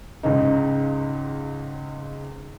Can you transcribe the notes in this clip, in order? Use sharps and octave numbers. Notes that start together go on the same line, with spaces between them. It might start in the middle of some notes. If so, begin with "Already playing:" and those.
C#2 G#2 C#3 D#4